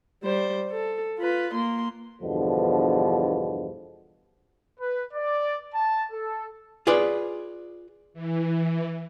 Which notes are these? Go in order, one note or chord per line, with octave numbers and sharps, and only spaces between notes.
G3 C5
A4
F4 B4
A#3 C6
E2 G2 B2 D3 F3
B4
D5
A5
A4
F4 G#4 B4 D5
E3